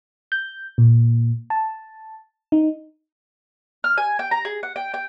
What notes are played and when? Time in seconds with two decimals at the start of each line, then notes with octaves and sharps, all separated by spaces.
0.32 G6
0.78 A#2
1.50 A5
2.52 D#4
3.84 F6
3.98 G#5
4.19 G5
4.31 A#5
4.45 G#4
4.63 F#5
4.76 G5
4.94 G5